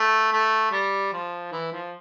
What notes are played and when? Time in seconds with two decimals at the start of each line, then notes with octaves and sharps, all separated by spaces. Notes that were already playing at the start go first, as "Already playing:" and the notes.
Already playing: A3
0.32 A3
0.72 G3
1.12 F3
1.52 E3
1.72 F3